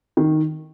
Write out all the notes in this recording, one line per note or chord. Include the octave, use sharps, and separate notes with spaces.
D#3